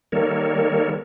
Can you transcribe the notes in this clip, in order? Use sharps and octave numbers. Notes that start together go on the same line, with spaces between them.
D#3 G3 A#3 A4 A#4 C#5